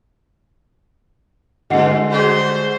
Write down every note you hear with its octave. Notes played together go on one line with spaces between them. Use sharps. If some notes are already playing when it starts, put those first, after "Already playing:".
G2 B2 D3 G#3 D#5 F#5 C7
G3 F#4 G#4 C5